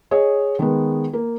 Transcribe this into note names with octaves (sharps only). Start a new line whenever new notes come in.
G#4 C#5 D#5
D#3 G#3 B3
A#3